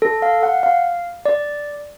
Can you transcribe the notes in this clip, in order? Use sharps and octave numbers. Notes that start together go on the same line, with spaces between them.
A4
F5
F#5
F5
D5